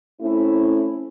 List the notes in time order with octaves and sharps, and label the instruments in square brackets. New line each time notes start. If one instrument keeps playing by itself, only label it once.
[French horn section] A3 C4 C#4 E4